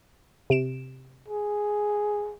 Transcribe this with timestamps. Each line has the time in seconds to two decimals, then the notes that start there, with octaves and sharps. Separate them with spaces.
0.50 C3 D7 E7
1.28 G#4